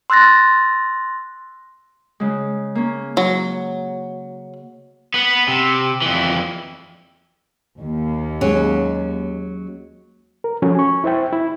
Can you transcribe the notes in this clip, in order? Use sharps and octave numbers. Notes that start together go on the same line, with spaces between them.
C6 E6 F#6 A6 A#6
C#3 G#3
A#3 C#4
F#3
B3 B4
C3
F2 E3
D#2
F#3 G#3 C#4
A#4
F3 C#4 F#4 A4
G#5 C#6
E4 C5 E5 G5
E4